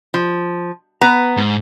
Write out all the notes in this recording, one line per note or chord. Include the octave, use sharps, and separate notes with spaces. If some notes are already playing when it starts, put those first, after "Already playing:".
F3
B3 B4 A#5
G#2